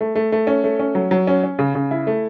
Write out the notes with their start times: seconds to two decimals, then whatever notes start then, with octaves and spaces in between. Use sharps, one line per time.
0.01 A3
0.16 A3
0.32 A3
0.47 C#4
0.64 A3
0.79 C#4
0.95 F#3
1.11 F#3
1.27 C#4
1.43 C#4
1.59 C#3
1.75 C#3
1.91 E4
2.07 A3